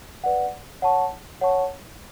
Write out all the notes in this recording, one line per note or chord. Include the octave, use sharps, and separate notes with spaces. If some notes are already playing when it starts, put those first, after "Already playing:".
B4 D5 F#5
C#5 F#5 A5 C#6
C#5 F#5 A5 C#6